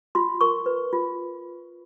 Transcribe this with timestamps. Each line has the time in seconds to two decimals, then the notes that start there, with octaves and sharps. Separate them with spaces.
0.15 F4 C6
0.41 A#4 C#6
0.66 B4
0.93 F4